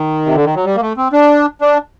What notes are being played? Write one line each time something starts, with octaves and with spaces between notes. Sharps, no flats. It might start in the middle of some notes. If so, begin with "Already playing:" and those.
Already playing: D#3
C3
D3
D#3
F#3
G3
A#3
A3
C4
D4
D4